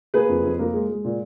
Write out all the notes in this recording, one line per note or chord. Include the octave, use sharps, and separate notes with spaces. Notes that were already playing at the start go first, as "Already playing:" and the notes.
A#3 G#4 B4
F2
F2
A#3
G#3
G#3
A#2